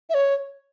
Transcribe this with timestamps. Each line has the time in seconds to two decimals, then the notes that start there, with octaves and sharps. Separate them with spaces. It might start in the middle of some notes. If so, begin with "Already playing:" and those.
0.10 E5
0.14 C#5